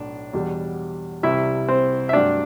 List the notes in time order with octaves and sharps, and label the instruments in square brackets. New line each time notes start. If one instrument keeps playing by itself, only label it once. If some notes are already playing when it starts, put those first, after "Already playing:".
Already playing: [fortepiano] B1 A2 D4
E2 B2 G3
C2 C3 G3 E4 E5
C4 C5
E5
G2 F#3 A3 D4 D5